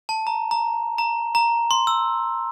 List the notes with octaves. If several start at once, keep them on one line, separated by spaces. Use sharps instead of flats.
A5
A#5
A#5
A#5
A#5
C6
E6